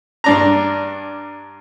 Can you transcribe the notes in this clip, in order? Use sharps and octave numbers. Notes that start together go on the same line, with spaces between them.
G2 D4 A#5